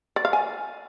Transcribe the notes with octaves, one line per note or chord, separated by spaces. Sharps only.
D5
F5
G#5